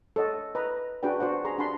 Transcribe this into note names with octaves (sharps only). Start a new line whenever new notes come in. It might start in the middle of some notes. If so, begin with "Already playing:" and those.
A4 C#5 D#5 F#5
B4 D#5 A#5
D4 F#4 G#4 B4 D5 G5
F#4 C5 D5 F#5
G#4 A#5 C6
D4 G4 F#5 A5 B5 C6